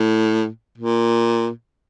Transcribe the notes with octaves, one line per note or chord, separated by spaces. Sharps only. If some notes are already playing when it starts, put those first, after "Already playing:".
Already playing: A2
A#2